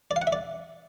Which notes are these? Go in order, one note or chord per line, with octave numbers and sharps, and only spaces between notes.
D5
F5
F#5
E5
D5